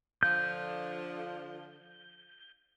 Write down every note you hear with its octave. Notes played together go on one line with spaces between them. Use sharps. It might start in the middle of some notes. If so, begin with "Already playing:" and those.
D3 F3 G6